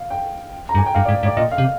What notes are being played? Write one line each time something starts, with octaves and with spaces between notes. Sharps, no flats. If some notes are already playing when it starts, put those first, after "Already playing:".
Already playing: F5
G5
A#5
G2
G#5
G5
G2 F5
D5
G#2
G#2
D5
A#2 D#5
F5
C3